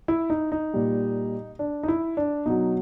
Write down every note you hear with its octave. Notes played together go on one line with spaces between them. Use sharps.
E4
D#4
D#4
A#2 G3
D4
D#4
E4
D4
B2 F#3 D#4